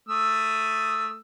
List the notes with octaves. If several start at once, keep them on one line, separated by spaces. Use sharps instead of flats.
A3 D#6 E6